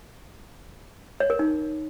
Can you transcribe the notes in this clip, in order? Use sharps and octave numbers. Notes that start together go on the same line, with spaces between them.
C#5
A#4
D#4